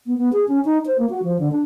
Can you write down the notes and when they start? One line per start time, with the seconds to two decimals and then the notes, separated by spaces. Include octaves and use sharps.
0.06 B3
0.17 B3
0.32 G#4
0.48 C#4
0.65 D#4
0.86 C5
0.98 A#3
1.10 F#4
1.23 F3
1.39 D3
1.52 D4